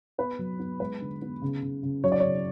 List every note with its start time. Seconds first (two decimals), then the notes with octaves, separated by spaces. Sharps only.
0.18 B3 B4
0.39 F#3
0.60 B3
0.80 G#3 B4
1.01 D3
1.22 B3
1.42 C#3
1.62 C#3
1.83 C#3
2.04 F#3 C#5
2.12 D5
2.20 C#3 C#5